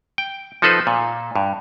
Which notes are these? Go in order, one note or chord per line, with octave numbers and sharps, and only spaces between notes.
G5
F3 D#4 A4 B4 C5
A#2
G2